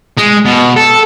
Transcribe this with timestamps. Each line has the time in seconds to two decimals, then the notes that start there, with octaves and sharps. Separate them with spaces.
0.18 G#3
0.46 B2
0.77 A4